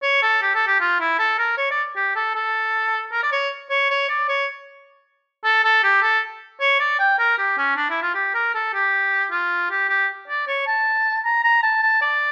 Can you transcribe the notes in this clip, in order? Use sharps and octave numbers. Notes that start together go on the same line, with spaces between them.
C#5
A4
G4
A4
G4
F4
E4
A4
A#4
C#5
D5
G4
A4
A4
A#4
D5
C#5
C#5
C#5
D5
C#5
A4
A4
G4
A4
C#5
D5
G5
A#4
G4
C#4
D4
E4
F4
G4
A#4
A4
G4
F4
G4
G4
D5
C#5
A5
A#5
A#5
A5
A5
D5